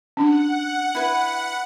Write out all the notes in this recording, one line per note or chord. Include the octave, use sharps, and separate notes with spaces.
C#4 D4 F#5
E4 B4